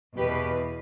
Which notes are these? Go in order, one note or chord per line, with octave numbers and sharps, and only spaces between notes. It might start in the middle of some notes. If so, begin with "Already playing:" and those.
E2 B2 G4 B4